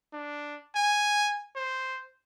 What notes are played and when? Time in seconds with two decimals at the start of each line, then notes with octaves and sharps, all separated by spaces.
0.13 D4
0.75 G#5
1.56 C5